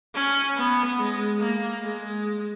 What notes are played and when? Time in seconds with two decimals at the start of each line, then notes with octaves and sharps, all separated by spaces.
0.15 C#4
0.57 B3
0.99 G#3
1.40 A#3
1.82 G#3